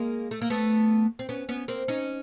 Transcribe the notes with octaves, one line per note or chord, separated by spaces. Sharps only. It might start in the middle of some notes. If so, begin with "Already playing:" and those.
Already playing: G#3 A#3
A3
A#3
A3 B3
C4
B3 C#4
B3 C#4
A#3 C4
C#4 D#4